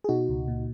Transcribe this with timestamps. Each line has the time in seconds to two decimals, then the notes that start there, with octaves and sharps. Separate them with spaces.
0.04 G#4
0.09 B2 D#4 F#4
0.29 C#2
0.48 A#2